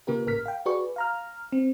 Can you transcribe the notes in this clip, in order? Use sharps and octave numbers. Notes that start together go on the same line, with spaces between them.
C#3 A#3 F4 G4 A#4 B4
G#1 A2 A#4 F6 B6
F5 G5
F#4 G#4 B4 D5 C#6
F5 A#5 F6
C4